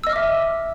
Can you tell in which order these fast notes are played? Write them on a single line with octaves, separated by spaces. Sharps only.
E6 D#5 F6 D6 E5